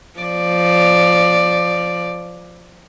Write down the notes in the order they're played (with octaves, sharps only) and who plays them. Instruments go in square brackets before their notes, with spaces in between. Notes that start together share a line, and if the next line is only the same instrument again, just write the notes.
[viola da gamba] F3 D5